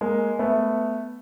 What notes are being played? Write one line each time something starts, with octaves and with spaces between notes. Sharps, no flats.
G#3 A#3
A3 B3